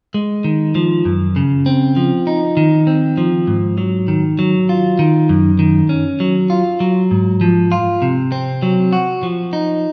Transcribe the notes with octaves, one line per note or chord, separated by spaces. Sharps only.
G#3
D#3
F3
F#2
C#3
C4
F3
D#4
D#3
C4
F3
G#2
F#3
D#3
F#3
F4
D#3
F#2
D#3
C#4
F#3
F4
F#3
G#2
F3
F4
C3
C4
F#3
F#4
F3
D#4